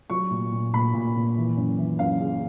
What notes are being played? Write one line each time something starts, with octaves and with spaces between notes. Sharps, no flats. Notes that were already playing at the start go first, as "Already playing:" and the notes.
F#3 C#6
A#2
A#2
A#2 B5
A#2
A#2
E3
F#2
E3
F#2 F5
C#3